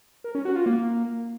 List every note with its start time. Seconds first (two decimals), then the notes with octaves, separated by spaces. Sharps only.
0.24 A#4
0.35 C#4
0.45 F#4
0.56 F4
0.66 A#3